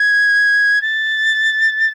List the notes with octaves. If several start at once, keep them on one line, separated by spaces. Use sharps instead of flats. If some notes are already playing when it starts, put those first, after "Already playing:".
Already playing: G#6
A6